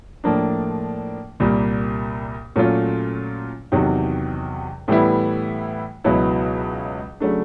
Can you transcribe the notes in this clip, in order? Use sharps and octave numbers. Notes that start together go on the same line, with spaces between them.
A2 F3 A#3 D4
C2 A#2 G3 A#3
A#2 F#3 A3 C#4 F4
E2 C3 D#3 F#3
A2 E3 G3 B3 E4
C#2 B2 F#3 B3 E4
C#3 F#3 A3 D4